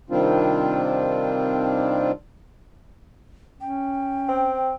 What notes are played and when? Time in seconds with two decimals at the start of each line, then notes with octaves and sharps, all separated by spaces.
0.10 C3 D#3 G3 C4 D4 F4
3.61 C#4 G5
4.29 C4